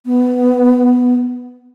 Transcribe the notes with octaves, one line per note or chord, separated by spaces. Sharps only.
B3